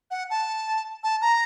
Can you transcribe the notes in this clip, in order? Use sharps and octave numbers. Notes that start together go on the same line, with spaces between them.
F#5
A5
A5
A#5